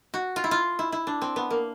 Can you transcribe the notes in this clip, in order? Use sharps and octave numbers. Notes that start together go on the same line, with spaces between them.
F#4
F4
E4
F4
E4
E4
D4
C4
B3
A#3